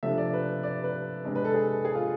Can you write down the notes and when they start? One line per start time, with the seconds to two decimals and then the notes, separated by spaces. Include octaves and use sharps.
0.03 C3 F3 A3 D4 E5
0.18 D5
0.33 B4
0.63 D5
0.84 B4
1.24 C3 G#3 D4
1.35 B4
1.45 A4
1.54 G#4
1.85 G#4
1.95 F4